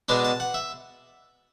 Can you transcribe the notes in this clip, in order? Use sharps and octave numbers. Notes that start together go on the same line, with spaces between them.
B2 G#3 B3 D4 A5
A5
F#5
E5